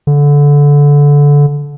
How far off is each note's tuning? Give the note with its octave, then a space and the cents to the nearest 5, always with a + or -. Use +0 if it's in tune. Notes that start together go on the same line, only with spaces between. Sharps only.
D3 -20